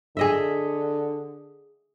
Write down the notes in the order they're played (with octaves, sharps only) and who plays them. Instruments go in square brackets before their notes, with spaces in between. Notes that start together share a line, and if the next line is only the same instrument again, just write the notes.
[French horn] D3 [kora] G#4 D#5 E5